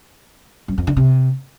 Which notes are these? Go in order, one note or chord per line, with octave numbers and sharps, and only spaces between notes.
F#2
F2
D3
C3